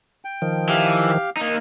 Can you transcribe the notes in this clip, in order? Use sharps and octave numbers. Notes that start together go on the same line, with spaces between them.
G5
D#3 F3
E3 G4 F5
A#3 D#4